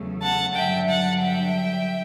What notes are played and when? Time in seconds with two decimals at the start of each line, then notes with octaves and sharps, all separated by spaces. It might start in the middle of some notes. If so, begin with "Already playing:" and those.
Already playing: E2 C#3 F#3 A3
0.22 F#5 A5
0.55 G2 D3 F#3 E5 G5
0.88 F#5 A5
1.22 E5 G5